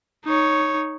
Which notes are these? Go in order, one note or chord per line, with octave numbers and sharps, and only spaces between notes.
D#4 C#5